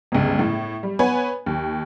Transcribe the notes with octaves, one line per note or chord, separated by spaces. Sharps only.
G1 C#2
A2
G3
B3 B4 C#5 G#5
D#2